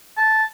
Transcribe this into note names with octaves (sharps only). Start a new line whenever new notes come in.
A5